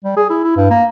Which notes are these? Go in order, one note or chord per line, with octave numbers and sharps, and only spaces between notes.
G3
G#4
E4
E4
G2
A#3